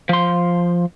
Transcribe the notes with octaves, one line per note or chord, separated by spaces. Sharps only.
F3 C6